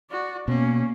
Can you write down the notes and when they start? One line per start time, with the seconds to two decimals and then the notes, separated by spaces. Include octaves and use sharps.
0.10 F#4 D5
0.48 B2 A#3 C#4